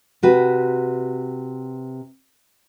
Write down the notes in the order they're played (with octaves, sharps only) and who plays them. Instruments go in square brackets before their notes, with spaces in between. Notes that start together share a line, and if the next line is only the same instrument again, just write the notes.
[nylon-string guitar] C3 F#4 B4